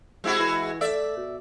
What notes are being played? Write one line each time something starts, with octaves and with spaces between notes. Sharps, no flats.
C3 G#3 E4 F#4
E3
A3 D5 E5
B2